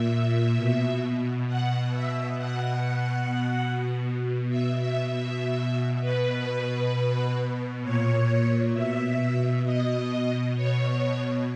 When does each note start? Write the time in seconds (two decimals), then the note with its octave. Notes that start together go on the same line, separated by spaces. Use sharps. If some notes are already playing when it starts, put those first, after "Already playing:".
Already playing: A#2 E5
0.56 B2
1.47 B2 F#5
1.91 E5
2.38 B2 F#5
3.28 B2
4.19 B2
4.49 E5
4.80 E5
5.09 B2 E5
6.01 B2 B4
6.91 B2
7.82 A#2 C#5
8.74 B2 E5
9.64 B2 D#5
10.55 B2 C#5